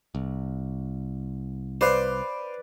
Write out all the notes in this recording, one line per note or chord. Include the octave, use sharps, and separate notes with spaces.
C2
B4 C5 D5 F5